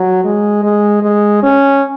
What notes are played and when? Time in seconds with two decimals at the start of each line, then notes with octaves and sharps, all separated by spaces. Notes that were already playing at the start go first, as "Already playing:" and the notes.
Already playing: F#3
0.24 G#3
0.64 G#3
1.03 G#3
1.43 C#4